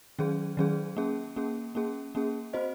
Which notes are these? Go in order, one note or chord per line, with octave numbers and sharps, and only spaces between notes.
D#3 F#3 C#4 G#4
D#3 F#3 C#4 G#4
A#3 C#4 G#4
A#3 C#4 G#4
A#3 C#4 G#4
A#3 C#4 G#4
C4 F#4 C5 D#5